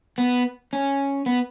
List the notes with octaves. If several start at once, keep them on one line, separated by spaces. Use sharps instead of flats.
B3
C#4
B3